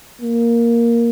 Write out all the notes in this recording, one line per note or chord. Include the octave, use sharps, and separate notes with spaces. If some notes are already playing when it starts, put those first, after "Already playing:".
A#3